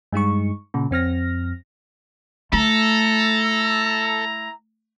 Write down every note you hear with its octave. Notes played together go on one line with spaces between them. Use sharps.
G2 G#3 D#4 C#6
A#2 C#3
F2 C4 F6 A#6
A3 E4 A4 A#5